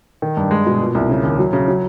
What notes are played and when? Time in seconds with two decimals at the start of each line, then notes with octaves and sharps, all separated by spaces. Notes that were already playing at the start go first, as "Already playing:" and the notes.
0.22 D#3
0.37 G2
0.51 G#3
0.66 B2
0.81 A#2
0.95 C2
1.10 C#3
1.23 D#2
1.39 F#3
1.53 C#3
1.68 F#3